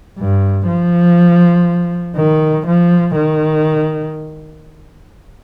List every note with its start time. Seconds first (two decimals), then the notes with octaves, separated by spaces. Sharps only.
0.19 G2
0.68 F3
2.17 D#3
2.67 F3
3.16 D#3